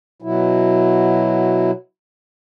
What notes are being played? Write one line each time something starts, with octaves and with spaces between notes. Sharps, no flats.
B2 F#3 E4